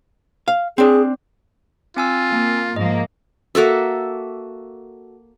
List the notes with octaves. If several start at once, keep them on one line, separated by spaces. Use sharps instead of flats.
F5
C4 D4 G#4
C4 F4 G#5 E6
A#3
G#2 F3 A#3 D#5
A#3 F#4 A4 E5